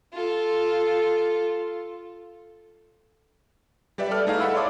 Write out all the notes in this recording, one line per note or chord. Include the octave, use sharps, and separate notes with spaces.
F4 A4
G3 G4 B4 D5 E5
A4 D5 F6
A3 D#4 E4 G#4 A4 F5
A4 E5 F#5 B5 E6
C#5 D5 C6 D6 D#6